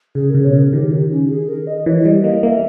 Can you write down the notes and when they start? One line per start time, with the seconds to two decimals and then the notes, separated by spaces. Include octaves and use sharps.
0.15 C#3 G#4
0.30 C#3 A#4
0.44 B2 C#5
0.53 C#3
0.58 A#4
0.73 D#3 G4
0.92 D#4
1.11 C#4
1.29 G#4
1.48 A#4
1.67 D#5
1.86 E3 C#5
1.99 C#5
2.05 G3 D#5
2.24 A#3 D#5
2.43 A#3 E5